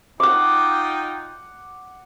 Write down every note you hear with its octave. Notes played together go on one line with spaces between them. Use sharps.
D#4 F4 F#5 G5 D6